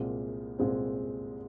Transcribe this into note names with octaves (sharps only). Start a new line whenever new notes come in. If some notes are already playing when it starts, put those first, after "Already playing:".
Already playing: C2 A#2 G#3 C4
C2 A#2 G#3 C4